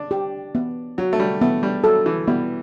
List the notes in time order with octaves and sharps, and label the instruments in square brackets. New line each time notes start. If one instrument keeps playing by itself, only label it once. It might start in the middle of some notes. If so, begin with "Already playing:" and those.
Already playing: [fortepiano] D4
[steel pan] G4
B3
[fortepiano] F#3 [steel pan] F#4
[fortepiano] A3
G3
[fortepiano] A3 [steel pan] B3
[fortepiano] G3
[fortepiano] F#3 [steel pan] A4
[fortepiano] E3
[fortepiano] G3 [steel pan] B3